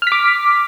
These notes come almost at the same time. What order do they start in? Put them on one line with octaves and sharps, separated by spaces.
F6 B6 D6